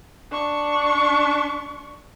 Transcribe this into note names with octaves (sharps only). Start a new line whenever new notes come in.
D4 C#6